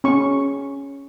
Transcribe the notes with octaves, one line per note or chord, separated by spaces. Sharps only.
C#4 C#6